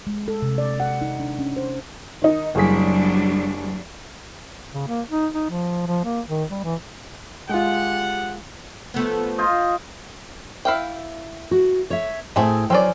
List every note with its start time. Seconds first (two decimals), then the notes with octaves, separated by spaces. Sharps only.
0.07 G#3
0.28 A4
0.42 C3
0.58 D5
0.80 F#5
1.01 D#4
1.20 D4
1.39 C#4
1.57 C5
2.22 D#3 D#4
2.55 F#1 F#3 G3 D4 G#4 B6
4.74 C#3
4.88 A#3
5.09 D#4
5.34 D#4
5.50 F3
5.87 F3
6.05 A#3
6.28 D#3
6.50 G3
6.64 E3
7.49 G#3 F4 G4 F#5
8.94 F3 A3 B3
9.38 F4 C5 D#5
10.65 E4 F5 G5
11.51 F#4
11.90 C#5 E5
12.36 A2 A3 C4 G#4
12.70 F#3 C4 C#4 D5